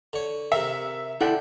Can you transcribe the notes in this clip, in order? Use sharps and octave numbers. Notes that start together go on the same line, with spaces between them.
D3 C#5
C3 A#4 E5
D4 E4 A4 F#5 G5